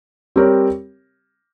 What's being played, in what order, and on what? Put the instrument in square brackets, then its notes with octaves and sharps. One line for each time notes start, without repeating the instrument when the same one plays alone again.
[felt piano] G3 C4 G4 A#4 C#5